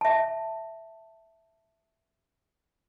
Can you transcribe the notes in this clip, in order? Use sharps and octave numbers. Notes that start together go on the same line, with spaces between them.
E5 A5